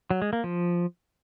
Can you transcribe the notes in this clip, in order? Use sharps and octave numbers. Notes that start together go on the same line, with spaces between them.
F#3
G#3
A#3
F3